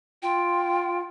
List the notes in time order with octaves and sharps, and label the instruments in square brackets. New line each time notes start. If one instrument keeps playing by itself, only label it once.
[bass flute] F4 [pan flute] G5